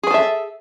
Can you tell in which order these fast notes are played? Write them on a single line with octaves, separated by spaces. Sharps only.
G#4 B4 A4 E5